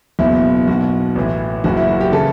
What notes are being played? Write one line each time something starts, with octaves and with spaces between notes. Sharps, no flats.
F#1 E2 B2 E4
B1 B2 F#4
A1 A2 E3
F#1 F#2 E3 F#4
E4
F#4
G4
C#3 E3 A4